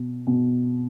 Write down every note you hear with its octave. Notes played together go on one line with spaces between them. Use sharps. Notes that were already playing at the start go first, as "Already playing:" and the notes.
Already playing: B2
B2